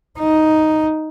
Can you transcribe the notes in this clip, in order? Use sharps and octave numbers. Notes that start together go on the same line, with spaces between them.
D#4